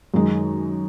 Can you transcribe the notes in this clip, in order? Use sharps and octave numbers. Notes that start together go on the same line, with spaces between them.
F#2 D#3 G#3 D#4